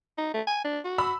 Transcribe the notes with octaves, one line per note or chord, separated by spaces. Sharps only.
D#4
A3
G#5
D4
F#4
B5 E6